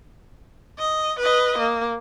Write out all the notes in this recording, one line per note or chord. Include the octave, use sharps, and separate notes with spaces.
D#5
B4 D#5
A#3